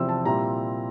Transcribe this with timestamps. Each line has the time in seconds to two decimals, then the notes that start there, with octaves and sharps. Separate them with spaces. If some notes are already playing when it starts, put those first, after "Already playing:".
Already playing: E2 C3 F3 C4 E4 E6
0.09 A5
0.25 A#2 G3 C4 E4 A#5